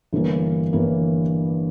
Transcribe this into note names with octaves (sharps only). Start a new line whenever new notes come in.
G1 G2 E3 A#3
G1 G2 E3 A#3